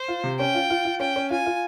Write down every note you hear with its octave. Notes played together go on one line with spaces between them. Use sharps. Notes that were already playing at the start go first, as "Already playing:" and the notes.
Already playing: C5
F4
C3
C#4 G5
F4
F4
F4
C#4 G5
C#4
F4 G#5
F4